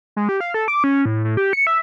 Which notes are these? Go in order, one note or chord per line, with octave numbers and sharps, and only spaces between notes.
G#3
G4
F5
A4
D6
C#4
A2
A2
G4
C#7
E5